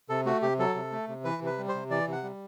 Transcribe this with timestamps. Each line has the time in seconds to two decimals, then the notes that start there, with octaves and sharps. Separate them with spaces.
0.09 C3 A4
0.25 A3 F#4
0.42 C3 G4
0.59 F#3 A4
0.75 C3
0.92 A3
1.08 C3
1.24 E3 B4
1.42 C3 B4
1.58 G3
1.68 C5
1.75 C3
1.90 E3 D5
2.07 C3 F#5
2.23 G3